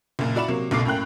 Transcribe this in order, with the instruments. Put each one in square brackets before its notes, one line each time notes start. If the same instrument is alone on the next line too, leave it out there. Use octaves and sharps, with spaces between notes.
[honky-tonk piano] F#1 F#2 A#2
E4 F#4 D5 B5 E7
C3 F#3 A#3
F#1 B1 B2 A3 D6 C7
F#2 A2 A#3 G5 F#6